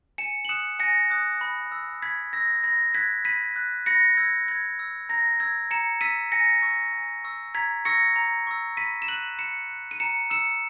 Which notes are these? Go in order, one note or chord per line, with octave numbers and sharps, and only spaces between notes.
G#5 C#7 E7
F#7
D#6 F#6 C#7 E7
G#5 A#6 C#7
D#6 F#6
B5
E6
B5 G#6 B6
E6 A#6
B5 A#6
F#6 G#6 B6
B5 B6 D#7
F#6
B5 A#6 C#7
E6 G#6
B5 G#6
E6
A#5 A#6
E6 G#6
A#5 C#7 E7
E6 B6 D#7
G#5 A#6 C#7
C#6 E6
G#5
C#6 E6
A#5 G#6 B6
C#6 E6 A#6 C#7
A#5
C#6 E6
B5 B6 D#7
E7
F#6 D#7 F#7
B5 C#7 E7
F#6
D#7
A#5 C#7 E7
E6 C#7 E7